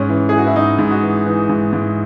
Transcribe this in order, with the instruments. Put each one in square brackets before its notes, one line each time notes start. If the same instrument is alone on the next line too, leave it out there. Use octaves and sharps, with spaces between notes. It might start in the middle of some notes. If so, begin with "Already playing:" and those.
Already playing: [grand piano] G#2 C#4
E3
E3 G#4
F#4
E4
G#2 D#4
G#2
F#4
E3
E3
G#2
G#2